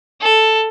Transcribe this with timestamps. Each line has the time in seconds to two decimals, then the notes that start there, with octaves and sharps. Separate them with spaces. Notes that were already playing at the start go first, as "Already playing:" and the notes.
0.21 A4